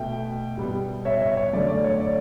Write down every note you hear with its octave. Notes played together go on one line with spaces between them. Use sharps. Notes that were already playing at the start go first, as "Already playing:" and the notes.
Already playing: B2 A3 E5 G5
B2 G3 B3
C#5 E5
C#5 E5
C#5
F#2 D3 A3 D5
D5
C#5
D5